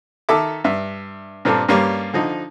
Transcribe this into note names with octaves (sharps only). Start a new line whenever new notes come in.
D#3 A4 E5 D6
G2 E5
G2 A#2 C4 D4 A4
G2 G3 A#3 C#4
D3 F3 D#4